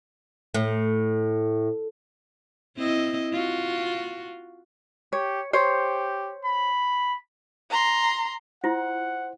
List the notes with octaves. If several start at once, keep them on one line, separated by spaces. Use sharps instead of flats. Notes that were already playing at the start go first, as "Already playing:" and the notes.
A2
C4 E4 D#5
F4 F#4
G4 C#5
G4 C5 C#5
B5
A#5 C6
E4 F4 C5 F#5